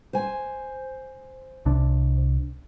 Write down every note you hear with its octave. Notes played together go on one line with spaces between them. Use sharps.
C5 G#5
C2 C3 D4